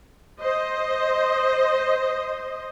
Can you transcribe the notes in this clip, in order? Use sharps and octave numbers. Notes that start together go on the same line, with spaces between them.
C5 D#5